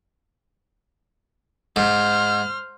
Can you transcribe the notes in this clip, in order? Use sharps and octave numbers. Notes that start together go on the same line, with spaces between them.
G#2 C5 F6